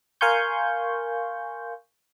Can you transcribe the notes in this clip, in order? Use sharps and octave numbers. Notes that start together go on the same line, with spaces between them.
A#4 F5 G#5 C6 C#6 G6